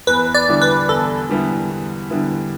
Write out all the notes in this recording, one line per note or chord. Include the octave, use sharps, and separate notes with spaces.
E2 B4
D5
D3 G3 B3 E4
B4
E2 A4
D3 G3 B3 E4
E2
D3 G3 B3 E4